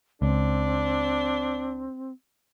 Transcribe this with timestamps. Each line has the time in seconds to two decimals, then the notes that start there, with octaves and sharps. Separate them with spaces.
0.22 C#2 C4 D4